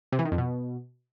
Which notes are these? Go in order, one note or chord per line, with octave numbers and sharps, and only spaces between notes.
C3
E3
D#3
F2
B2